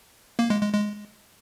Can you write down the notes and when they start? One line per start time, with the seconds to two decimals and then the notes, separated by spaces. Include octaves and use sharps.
0.39 A#3
0.50 G#3
0.61 G#3
0.73 G#3